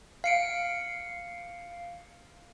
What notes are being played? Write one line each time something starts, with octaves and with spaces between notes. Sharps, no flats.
F5 C#7 D7